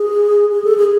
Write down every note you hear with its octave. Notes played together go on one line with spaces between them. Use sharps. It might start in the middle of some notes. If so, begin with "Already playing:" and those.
Already playing: G#4
G#4
A4
G#4